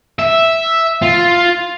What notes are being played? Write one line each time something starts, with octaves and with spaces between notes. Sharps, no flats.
E5
F4